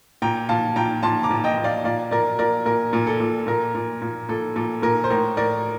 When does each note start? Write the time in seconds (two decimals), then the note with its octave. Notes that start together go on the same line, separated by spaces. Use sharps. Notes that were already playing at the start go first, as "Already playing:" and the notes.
0.22 A#2 G5 A#5
0.49 A#2 F5 A5
0.76 A#2 G5 A#5
1.03 A#2 A5 C6
1.23 A#5 D6
1.31 A#2
1.44 D#5 G5
1.58 A#2
1.64 D5 F5
1.84 A#2 D5 F5
2.11 A#2 A#4 D5
2.39 A#2 A#4 D5
2.65 A#2 A#4
2.93 A#2
3.07 A4
3.20 A#2
3.47 A#2 A#4
3.75 A#2
4.02 A#2
4.29 A#2 A4
4.56 A#2 A4
4.82 A#2 A#4
5.04 C5
5.10 A2 A#4
5.37 A2 A#4 D5